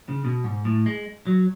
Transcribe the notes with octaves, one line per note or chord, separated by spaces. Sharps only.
C#3
B2
G#2
A2
G#3
F#3